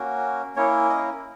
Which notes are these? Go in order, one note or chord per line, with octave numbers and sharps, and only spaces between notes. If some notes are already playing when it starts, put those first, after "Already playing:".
Already playing: A#3 C#4 F#4
A#3 C#4 E4 C#5
D#5